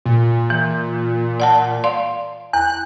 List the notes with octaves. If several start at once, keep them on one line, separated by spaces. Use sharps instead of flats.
A#2
E3
D5 F#5 A5
D5 F5 C6
E2 F#6